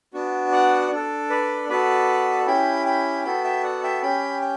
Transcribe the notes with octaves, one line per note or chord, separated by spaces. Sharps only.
B3 D4 F#4
D5 F#5
D4 A4
B4 D5
B3 F#4 A4 B4 D5
C#4 E4 G4 G5 B5
G5 B5
B3 F#4 A4 G5 B5
E5 G5
D5 F#5
E5 G5
C#4 G4 G5 B5
G5